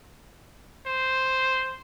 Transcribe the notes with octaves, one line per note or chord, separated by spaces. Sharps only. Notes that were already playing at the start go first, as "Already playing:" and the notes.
C5